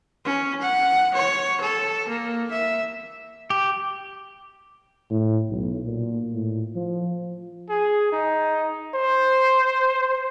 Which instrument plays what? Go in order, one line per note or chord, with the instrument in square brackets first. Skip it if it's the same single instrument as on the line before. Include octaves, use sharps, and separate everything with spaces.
[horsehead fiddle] C#4
F#5
C#5
A4
A#3
E5
[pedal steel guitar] G4
[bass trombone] A2
B1
A#2
A2
F3
[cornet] G#4
D#4
C5